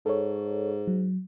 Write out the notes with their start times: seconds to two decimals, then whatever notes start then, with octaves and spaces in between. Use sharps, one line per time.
0.06 G#2 A4 C#5
0.87 F#3